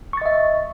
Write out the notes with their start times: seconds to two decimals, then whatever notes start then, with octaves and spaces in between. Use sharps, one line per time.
0.13 C#6
0.17 A6
0.21 D#5
0.26 E5